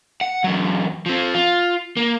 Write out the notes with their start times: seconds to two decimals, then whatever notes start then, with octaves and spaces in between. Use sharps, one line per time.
0.21 F#5
0.44 E2 F#3
1.06 F3 C4
1.34 F4
1.97 A#3